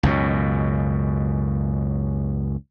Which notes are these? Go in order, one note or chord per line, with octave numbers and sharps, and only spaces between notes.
C#2 F#2 B2